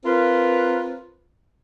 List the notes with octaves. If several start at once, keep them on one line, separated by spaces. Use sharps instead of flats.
C4 F4 A#4 B4